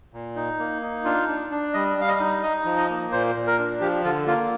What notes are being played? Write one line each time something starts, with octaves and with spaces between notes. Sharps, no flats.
A#2
D#4
A#3
D#4
D4 F4
D4
D4
G3 D#5
G3 F5
D#5
D#4
D#4 D#5
F3
D#5
A#3
A#2 C5
A#2
A#4
D4
F3 G4
D3 F4
A#3 F4